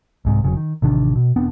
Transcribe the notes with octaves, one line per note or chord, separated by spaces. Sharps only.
C2 G#2 C3
F1 C#3 F#3
D#3
A1 C3 D#3 D4
B2
E1 B3 C4 D4